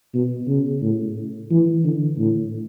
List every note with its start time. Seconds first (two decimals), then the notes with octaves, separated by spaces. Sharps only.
0.14 B2
0.48 C#3
0.82 A2
1.51 E3
1.84 D3
2.18 A2